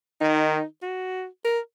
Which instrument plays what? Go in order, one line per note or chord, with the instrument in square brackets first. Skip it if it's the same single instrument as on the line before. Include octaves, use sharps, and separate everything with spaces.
[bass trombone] D#3 [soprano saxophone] D#4
[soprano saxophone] F#4
A#4